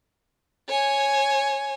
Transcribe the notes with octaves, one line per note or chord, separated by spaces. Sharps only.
C#5 G#5